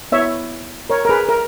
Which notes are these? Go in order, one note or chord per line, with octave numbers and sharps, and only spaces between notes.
B3 E4 C#5 E5
A#4 C#5
A#4
G#4 B4
A#4